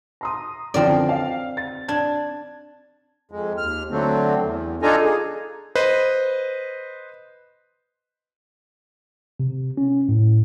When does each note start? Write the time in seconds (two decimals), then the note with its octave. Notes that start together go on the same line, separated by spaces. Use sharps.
0.21 A#5 C6 D#6
0.74 F#2 D3 F3 C4 A#4 D5
1.09 F5
1.57 A6
1.89 D4 G#6
3.31 F2 G#3
3.58 D#2 F6
3.91 D3 F#3 A3 C4
4.42 E2
4.82 D4 D#4 F4 A4 G#5 A#5
5.03 G#4
5.75 B4 C5 D#5
9.40 C3
9.77 C#4
10.09 A2